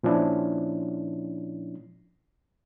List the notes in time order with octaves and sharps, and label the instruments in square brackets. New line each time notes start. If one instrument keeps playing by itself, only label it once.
[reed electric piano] A#2 F3 C#4 D4 E4